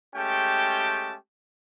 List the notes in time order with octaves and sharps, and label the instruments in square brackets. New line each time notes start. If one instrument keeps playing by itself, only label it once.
[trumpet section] G#3 A3 C#4 G4 G5 A5